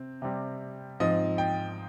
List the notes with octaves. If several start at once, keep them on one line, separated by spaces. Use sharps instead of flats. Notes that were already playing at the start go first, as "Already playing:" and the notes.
Already playing: C3 C4
C3 G3 C4
G#2 F3 C4 D#5
G5